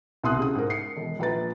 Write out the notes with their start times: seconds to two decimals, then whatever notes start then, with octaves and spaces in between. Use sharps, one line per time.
0.23 C2 B2 C6 D#6 F#6
0.37 C#3 G#4 D#6
0.55 G#2 A#4
0.70 C7 C#7
0.97 E1
1.19 A#1 B4 A#5 A6